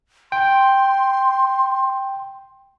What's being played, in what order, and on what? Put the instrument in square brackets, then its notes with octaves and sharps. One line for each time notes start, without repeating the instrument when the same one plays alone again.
[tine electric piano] G5 [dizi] C6